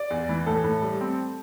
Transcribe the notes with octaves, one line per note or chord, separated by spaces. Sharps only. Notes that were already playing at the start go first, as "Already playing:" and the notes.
Already playing: D5
E2
E3
A2 A4
A2
G3
C4